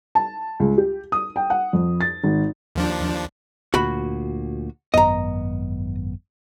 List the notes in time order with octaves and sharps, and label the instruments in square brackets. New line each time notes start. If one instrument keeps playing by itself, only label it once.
[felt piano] A5
C#2
G4
D#6
G5
F#5
F2
A6
G#1
[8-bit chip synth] D#2 F3 D4
[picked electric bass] D2 A#2 [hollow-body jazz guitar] F#4 B5
[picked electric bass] G#1 F#2 B3 [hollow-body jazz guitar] D#5 A#5